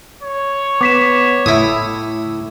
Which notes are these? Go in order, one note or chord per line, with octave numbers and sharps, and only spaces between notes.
C#5
B3 D6 B6 E7
A2 E4 D#6